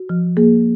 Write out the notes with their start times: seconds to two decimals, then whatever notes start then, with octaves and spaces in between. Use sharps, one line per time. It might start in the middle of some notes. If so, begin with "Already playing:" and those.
Already playing: F#4
0.09 F3
0.37 A#3 G#4